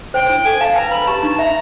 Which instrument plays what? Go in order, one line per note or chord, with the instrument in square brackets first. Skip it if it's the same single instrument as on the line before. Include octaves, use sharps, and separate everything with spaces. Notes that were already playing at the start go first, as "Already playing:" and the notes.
[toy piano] C5 [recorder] G5
[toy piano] E4
[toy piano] A4 [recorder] G#5
[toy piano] F5 [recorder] A5
[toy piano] B4 [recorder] A#5
[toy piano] B4 [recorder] B5
[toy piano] G4 [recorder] A5
[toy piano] D#4
[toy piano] E5 [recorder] A#5